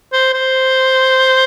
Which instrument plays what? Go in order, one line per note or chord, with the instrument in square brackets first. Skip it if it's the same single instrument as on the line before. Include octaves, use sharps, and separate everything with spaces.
[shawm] C5
C5